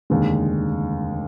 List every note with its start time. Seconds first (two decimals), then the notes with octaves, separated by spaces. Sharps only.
0.10 F1 D#2 D3 G#3